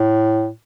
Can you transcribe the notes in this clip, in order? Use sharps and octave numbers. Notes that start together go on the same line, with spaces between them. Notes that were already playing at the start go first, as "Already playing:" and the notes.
Already playing: A2